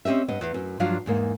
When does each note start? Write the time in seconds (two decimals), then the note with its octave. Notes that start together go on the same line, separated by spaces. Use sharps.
0.05 C4 C#4 G4 D#5 E5
0.28 G2 B3 D#5
0.41 E2
0.54 F#2
0.80 G2 F3 F#3 D4 F4 F5
1.06 E2 G#2 A#3